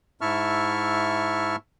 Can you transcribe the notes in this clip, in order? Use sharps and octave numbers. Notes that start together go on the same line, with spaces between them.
G#2 E4 E5 A5 C#6 F6